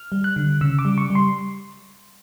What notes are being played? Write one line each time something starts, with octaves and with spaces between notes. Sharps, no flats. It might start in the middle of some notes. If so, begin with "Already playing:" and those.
Already playing: F6
G3
F#6
D3
C#3 E6
D6
G3
C#6
G3
C6